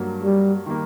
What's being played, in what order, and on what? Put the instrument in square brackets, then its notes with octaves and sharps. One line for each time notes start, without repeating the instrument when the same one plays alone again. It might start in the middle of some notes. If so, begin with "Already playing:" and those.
Already playing: [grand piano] G2 F#3 A#3 F#4
[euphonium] G3
[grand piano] D#3 G3 A#3